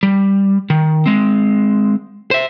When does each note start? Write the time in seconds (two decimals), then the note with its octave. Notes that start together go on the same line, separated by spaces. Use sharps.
0.03 G3
0.70 D#3
1.06 G#3 C4
2.31 C5 E5